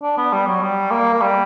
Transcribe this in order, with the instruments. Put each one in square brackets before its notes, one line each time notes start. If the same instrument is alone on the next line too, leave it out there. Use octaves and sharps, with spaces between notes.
[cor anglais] D4
B3
G3
F#3
G3
A#3
A#3
G3